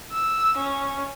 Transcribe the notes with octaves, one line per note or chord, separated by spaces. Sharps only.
E6
C#4